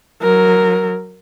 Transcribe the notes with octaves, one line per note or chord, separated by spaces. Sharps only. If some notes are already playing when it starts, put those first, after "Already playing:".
F#3 A#4